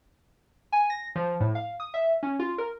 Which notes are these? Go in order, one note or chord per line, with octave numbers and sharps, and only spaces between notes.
G#5
A#6
F3
A2
F5
D#6
E5
C#4
F4
A#4